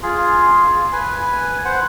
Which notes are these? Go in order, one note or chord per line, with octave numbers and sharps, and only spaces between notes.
F4 G#4
B4 G#5
C5 F#5